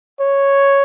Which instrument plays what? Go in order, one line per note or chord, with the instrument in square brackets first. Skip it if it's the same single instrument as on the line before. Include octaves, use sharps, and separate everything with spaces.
[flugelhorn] C#5